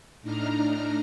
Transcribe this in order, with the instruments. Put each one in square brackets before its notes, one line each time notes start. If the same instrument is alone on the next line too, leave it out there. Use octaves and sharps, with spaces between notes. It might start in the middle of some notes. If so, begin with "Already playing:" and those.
[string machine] A2 D4 D#4 A#5 F6